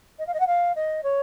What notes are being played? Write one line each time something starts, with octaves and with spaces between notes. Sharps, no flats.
D#5
F5
D#5
F#5
F5
D#5
C#5